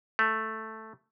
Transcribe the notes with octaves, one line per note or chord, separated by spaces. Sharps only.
A3